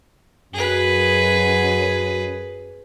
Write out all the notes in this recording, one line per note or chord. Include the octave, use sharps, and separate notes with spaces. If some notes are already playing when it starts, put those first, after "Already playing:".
F#2 G#4 B4